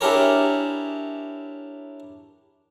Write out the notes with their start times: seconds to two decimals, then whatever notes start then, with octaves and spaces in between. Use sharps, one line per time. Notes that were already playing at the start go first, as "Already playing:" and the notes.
0.01 D4 E4 G4 G#4 A#4 C#5